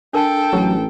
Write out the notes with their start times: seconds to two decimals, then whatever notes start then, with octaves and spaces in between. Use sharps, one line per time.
0.13 D4 A4 A#4 G5 A5
0.53 A1 F#3 G4 A#5